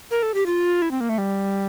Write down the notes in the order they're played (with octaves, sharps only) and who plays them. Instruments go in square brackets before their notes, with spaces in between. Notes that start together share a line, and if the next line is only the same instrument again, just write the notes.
[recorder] A#4
A4
G4
F4
E4
C4
A#3
A3
G3